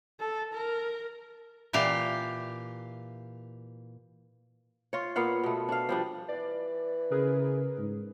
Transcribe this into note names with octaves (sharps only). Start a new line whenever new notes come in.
A4
A#4
A#2 E3 G4 F5
F4 C#5
A#2 B3 F5 F#5
B2 A3
D4 F5
F3 G3 D4
E3 D5
C#3 G#4 A#4 B4
G#2